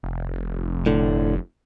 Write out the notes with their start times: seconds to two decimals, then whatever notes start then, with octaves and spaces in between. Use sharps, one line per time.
0.03 F1
0.86 A2 D3